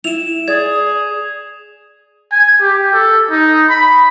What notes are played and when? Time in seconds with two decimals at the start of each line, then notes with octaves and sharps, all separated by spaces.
0.04 E4 E7 F7
0.48 G#4 D5 G#6
2.32 G#5
2.61 G4
2.93 A4
3.31 D#4
3.69 B5